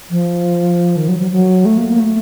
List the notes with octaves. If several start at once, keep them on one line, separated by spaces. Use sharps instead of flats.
F3
D#3
F#3
F#3
F#3
A3
A#3
A#3
A3